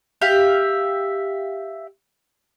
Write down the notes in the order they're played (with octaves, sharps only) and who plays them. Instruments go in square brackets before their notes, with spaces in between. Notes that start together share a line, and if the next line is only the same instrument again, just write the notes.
[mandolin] G4 E5 F5